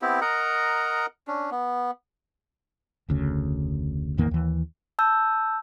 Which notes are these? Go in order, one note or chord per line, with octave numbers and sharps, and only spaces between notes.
B3 C4 E4 G4
A#4 D#5 F#5 A#5
C#4 D4
B3
F1 D2 C#3
A1 E2 D#3 A#3
D#2 E3
A5 E6 G6